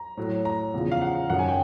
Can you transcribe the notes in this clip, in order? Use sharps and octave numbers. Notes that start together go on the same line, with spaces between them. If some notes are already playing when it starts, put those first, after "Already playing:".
Already playing: A#5
A2 F#3
A#5
E2 C#3 F3
F5
F#5
F#2 D#3 F#3 F#5
G#5
G5